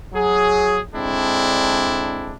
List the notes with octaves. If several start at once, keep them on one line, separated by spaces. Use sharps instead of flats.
F#3 G#4
D3 G#3 C4 D4 E4